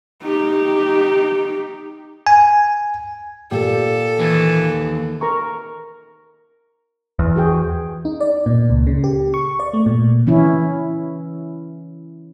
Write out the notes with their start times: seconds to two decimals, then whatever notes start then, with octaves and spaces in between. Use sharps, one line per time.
0.22 D#4 G4
2.27 G#5
3.51 A#2 G4 A4
4.20 D#2 E3
5.21 A#4 A#5 C#6
7.19 E2
7.36 F#4 G#4 G5
8.05 D#4
8.21 D5
8.46 A#2
8.70 C#2
8.87 C#3
9.04 G4
9.34 C#6
9.60 D5
9.73 A3
9.86 A#2
10.27 E3 C#4 E4